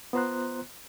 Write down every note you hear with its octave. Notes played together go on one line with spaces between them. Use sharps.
B3 F4 C5 A#5 C6 F#6